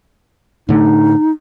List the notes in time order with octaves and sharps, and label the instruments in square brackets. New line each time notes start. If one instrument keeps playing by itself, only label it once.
[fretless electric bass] A2 D3 A3 [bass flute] D#4